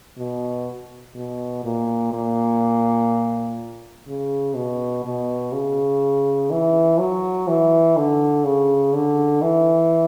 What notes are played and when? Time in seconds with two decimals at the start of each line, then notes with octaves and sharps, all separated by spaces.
0.18 B2
1.15 B2
1.64 A#2
2.13 A#2
4.08 C#3
4.56 B2
5.05 B2
5.53 C#3
6.51 E3
7.00 F#3
7.48 E3
7.97 D3
8.45 C#3
8.94 D3
9.42 E3